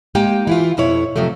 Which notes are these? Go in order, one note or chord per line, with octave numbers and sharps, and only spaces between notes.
G#3 A#3 D#4 G4 G5
E3 E4 F4
F2 B2 E4 C#5
F2 C3 F3 F#3 A3